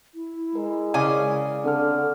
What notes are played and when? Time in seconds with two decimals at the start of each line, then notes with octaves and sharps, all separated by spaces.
0.14 E4
0.55 G#3 A#4
0.94 C#3 D5 F5 G#5 D6
1.64 D3 C4 A4 F6